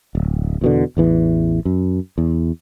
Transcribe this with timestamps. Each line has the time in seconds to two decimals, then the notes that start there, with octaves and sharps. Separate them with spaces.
0.15 D1
0.61 E2 B2 D3
0.97 A1 E2 E3
1.65 F#2
2.18 E2